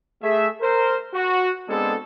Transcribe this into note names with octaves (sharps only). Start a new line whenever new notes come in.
A3 G#4 E5
A#4 C5
F#4
G#3 B3 C4 D4 G#4 A4